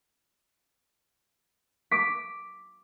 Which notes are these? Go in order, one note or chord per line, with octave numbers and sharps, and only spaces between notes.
D6 B6